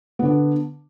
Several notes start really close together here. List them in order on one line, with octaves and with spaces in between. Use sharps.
B3 D3 D4